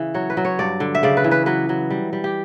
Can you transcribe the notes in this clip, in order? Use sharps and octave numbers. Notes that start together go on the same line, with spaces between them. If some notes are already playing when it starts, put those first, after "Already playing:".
Already playing: C#3 E3
F#3 C#5
B4
F#3
C#5
G2 D5
D3
E5
C#3 D5
B4
E3
B4
F#3 B4
F#3
G3
G3
G4